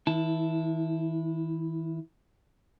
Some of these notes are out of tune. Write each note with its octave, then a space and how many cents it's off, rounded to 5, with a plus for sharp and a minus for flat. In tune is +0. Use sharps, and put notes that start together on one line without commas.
E3 -45 E4 +0 A5 +0